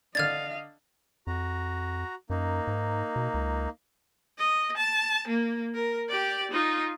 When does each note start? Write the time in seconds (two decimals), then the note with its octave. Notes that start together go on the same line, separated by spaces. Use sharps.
0.15 D3 D4 D#5 F5 F6 G#6 A6
1.27 F2 F#4 A#5
2.30 F#2 A#3 D#4
2.67 G#2
3.16 B2
3.34 C#2
4.38 D#5
4.77 A5
5.28 A#3
5.74 A#4
6.09 G4 D5
6.51 D#4 F4